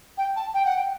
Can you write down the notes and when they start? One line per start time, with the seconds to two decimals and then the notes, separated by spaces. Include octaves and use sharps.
0.18 G5
0.36 A5
0.54 G5
0.65 F#5
0.76 G5